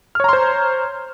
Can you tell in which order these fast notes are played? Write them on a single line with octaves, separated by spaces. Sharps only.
F6 C#5 A#5 C6 C5